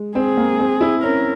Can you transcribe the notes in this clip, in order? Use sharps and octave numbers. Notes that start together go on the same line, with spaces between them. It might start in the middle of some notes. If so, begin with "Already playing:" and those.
Already playing: G#3
C4 G#4
A#3
C4
E4
C#4 A#4